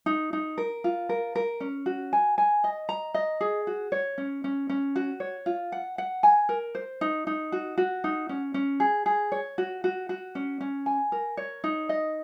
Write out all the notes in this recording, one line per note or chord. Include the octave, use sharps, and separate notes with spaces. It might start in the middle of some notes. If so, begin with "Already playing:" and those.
D#4
D#4
A#4
F4
A#4
A#4
C#4
F#4
G#5
G#5
D#5
A#5
D#5
G#4
F#4
C#5
C#4
C#4
C#4
F#4
C#5
F4
F#5
F#5
G#5
A#4
C5
D#4
D#4
F#4
F#4
D#4
C#4
C#4
G#4
G#4
C#5
F#4
F#4
F#4
C#4
C#4
G#5
A#4
C#5
D#4
D#5